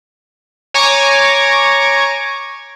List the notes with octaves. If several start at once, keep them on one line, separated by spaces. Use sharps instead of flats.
C#5 G#5 A#5 C#6 D6